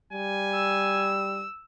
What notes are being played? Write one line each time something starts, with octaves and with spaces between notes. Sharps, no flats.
G3 G#5
E6